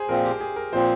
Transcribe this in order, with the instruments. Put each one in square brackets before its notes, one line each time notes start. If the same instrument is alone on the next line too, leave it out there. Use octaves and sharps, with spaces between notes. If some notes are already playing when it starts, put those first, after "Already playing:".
Already playing: [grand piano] G#4 C5
[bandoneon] A#2 F3 C4 [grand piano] A#4
[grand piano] G4
G#4
A#4
[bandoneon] A#2 F3 C4 [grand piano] C5